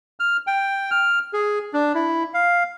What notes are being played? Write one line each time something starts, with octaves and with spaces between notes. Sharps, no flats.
F6
G5
F6
G#4
D4
E4
F5